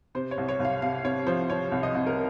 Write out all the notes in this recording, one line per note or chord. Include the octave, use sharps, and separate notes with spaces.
C3 C5
C#5
C2
C#5
C2
F5
C3 F5
C3 C#5
F3 C5
C3 C#5
C2
D#5
C2
A#4